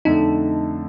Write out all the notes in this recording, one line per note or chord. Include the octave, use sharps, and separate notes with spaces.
F2 D3 A3 D#4